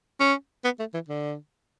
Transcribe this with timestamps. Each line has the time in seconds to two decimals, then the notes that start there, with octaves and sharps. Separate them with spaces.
0.20 C#4
0.64 B3
0.80 A3
0.94 E3
1.09 D3